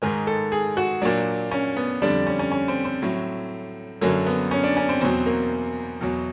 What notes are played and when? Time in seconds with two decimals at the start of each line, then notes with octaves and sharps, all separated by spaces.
0.02 G#2 D#3 G#3 A#4
0.27 A4
0.52 G#4
0.77 F#4
1.02 A#2 F#3 D4
1.51 C#4
1.76 B3
2.02 F2 D3 G3 D4
2.27 C#4
2.39 C#4
2.52 C#4
2.68 C4
2.85 C4
3.02 A2 F#3
4.01 F#2 D3 F#3 A#3
4.27 B3
4.51 C#4
4.63 D4
4.77 C#4
4.89 C4
5.01 E2 B2 F#3 C4
5.26 A#3
6.01 E2 B2 F#3